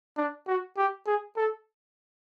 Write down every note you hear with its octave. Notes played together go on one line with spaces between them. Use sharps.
D4
F#4
G4
G#4
A4